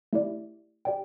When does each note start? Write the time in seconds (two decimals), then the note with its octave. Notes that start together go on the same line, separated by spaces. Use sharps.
0.13 A3 E4 G4 D5
0.85 G4 D5 G5